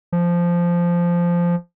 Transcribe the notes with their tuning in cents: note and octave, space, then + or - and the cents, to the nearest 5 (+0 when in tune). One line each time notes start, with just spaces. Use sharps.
F3 -10